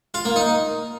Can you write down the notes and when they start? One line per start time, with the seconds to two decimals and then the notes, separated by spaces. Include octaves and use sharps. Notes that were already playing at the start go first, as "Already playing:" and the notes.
0.14 F4
0.25 A#3
0.36 D#4